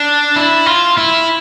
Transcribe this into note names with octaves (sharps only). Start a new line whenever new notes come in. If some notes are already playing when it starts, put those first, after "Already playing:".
Already playing: D4
E4
F4
E4